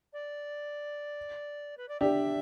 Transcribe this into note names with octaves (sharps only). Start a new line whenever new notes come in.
D5
B4
D5
D4 G4 E5